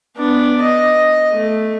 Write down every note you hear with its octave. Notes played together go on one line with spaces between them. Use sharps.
B3 D4
D#5
A3